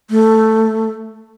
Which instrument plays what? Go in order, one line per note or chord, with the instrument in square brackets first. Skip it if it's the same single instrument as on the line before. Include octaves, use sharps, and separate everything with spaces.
[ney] A3